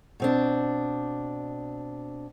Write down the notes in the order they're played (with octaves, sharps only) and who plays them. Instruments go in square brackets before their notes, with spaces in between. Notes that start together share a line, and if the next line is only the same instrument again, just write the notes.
[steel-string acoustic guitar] B2 C4 D4